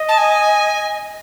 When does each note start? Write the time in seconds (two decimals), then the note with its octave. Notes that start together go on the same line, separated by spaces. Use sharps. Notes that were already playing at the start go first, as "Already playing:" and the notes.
Already playing: D#5
0.09 A5
0.18 G#5